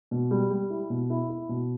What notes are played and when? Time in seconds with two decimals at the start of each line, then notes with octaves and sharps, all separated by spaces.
0.11 B2
0.31 G3
0.51 G3
0.70 E4
0.90 B2
1.10 E4
1.29 E4
1.49 B2